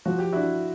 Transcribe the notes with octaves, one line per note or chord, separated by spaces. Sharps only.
F3 F#4
G4
D4 E4 F#4